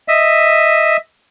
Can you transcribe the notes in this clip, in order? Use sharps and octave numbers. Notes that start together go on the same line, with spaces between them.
D#5 E5